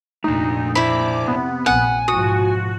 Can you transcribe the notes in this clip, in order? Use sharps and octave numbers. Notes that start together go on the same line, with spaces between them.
F1 A#2 A3 D4 D#4
D4 E4 C5 B5 D6
C3 B3
A#1 F#5 G#5
G#2 B2 F3 F#4 D#6